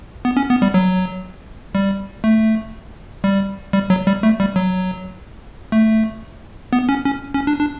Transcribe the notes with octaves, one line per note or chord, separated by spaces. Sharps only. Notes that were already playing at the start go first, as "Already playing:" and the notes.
B3
C#4
B3
G3
F#3
G3
A3
G3
G3
F#3
G3
A3
G3
F#3
A3
B3
C#4
C#4
C#4
D4
D4